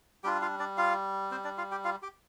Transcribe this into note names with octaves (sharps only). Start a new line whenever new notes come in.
G3 D4 F4 G4 G5
F4 F5
D4 D5
F4 F5
C4 C5
D4 D5
F4 F5
G4 G5
F4 F5
G4 G5